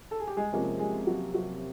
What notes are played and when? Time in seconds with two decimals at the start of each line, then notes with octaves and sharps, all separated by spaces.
0.11 A4
0.20 G#4
0.28 G4
0.36 G#3 G#4
0.52 C3 F3 G#3 A#3 C#4 G#4
0.79 G#3 G#4
1.07 F#3 F#4
1.34 F#3 F#4